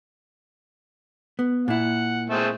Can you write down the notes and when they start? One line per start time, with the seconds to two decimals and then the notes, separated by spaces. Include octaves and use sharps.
1.39 B3
1.68 A#2 E4 F#5
2.30 G#3 A3 C4